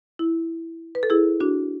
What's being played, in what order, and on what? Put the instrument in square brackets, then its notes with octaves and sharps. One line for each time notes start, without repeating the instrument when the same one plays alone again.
[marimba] E4
B4
A4
E4 G#4
D4 F#4